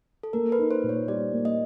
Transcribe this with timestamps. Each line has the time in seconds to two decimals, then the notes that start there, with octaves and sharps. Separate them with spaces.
0.23 A4
0.33 A#3 A#4
0.52 B4
0.58 D#4
0.71 C5
0.84 A#2
0.89 C#5
1.08 G3 D5
1.33 A#3
1.45 D#5